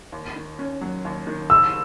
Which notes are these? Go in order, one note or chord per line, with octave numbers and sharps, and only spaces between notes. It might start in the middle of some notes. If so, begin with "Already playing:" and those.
D#2
D#3
C#4
F#3
D#2
D#3
F#1 E6